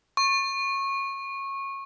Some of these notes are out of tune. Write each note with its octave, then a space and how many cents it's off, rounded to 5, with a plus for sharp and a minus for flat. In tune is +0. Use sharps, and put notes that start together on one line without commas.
C#6 -20